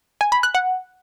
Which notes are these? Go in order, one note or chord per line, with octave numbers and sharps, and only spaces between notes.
G#5
B5
F#6
F#5